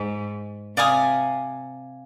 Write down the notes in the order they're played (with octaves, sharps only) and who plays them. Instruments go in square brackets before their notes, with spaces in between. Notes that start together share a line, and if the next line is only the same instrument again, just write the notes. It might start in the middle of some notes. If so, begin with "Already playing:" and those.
Already playing: [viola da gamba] G#2
[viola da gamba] C3 [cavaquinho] D5 F5 G#5 D#6